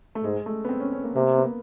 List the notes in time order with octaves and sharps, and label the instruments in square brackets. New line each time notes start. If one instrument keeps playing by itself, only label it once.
[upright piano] A3
[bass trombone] G#2 [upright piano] G#3
[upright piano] A3
B3
C4
C#4
C#4
A#3
[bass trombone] C3 [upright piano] A#3
[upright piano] B3
A#3